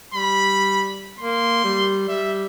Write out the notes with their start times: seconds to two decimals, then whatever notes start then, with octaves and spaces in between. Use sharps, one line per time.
0.14 G3 B5
1.20 A#3 C6
1.64 G3
2.09 G3 E5